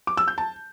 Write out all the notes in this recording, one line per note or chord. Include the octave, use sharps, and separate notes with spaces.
D6
E6
G6
A5